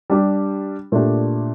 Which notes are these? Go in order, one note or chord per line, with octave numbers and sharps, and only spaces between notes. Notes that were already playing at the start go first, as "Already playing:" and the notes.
G3 D4 G4
A#2 A3 D4 G4